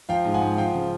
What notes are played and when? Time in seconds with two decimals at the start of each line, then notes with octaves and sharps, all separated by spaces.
0.09 F3 F5 G5
0.25 G#2
0.34 F#5 G#5
0.42 G#2
0.57 F3 F5 G5
0.74 C#3